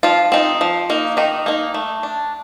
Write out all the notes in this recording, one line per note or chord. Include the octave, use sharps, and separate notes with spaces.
F3 F4
C4 D#4
F3
A#3 D#4
D#3 D#4
A#3 D#4
A3
D4